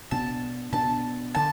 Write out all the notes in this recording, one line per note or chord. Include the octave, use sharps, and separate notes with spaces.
B2 B3 D4 A5
B2 B3 D4 A5
D3 A5